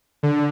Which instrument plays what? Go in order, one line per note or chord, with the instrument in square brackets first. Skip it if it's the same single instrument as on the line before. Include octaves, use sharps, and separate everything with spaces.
[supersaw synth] D3